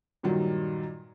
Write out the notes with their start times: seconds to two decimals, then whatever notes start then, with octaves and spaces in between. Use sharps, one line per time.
0.23 G2 A#2 D#3 F#3 G3